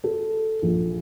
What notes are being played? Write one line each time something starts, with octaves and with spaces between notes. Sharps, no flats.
A4
A#1